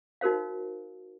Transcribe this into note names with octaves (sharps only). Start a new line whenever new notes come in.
D#4 F#4 A#4 C5 F5